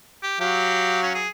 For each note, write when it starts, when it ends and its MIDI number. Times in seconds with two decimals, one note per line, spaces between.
0.23 0.36 67
0.40 1.25 54
0.40 1.01 67
0.40 1.25 77
1.03 1.13 61
1.14 1.29 68